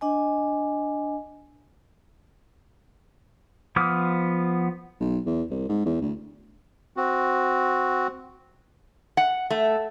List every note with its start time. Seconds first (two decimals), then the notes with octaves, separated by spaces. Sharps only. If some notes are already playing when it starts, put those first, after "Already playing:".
0.01 D4 D#5 G#5
3.76 F3 B3 D6 D#6 F6
5.00 B1
5.26 E2
5.51 C2
5.69 G#2
5.86 E2
6.01 D2
6.97 C4 F#4
9.17 F#5
9.50 A3